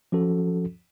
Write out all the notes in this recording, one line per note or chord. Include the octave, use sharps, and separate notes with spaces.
F3 C#4 F#4 A4